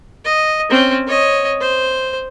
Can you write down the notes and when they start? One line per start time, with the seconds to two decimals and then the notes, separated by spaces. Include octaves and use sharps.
0.25 D#5
0.70 C4 C#4
1.07 C#5 D#5
1.61 C5